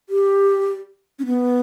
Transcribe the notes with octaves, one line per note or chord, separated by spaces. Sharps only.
G4
C#4
B3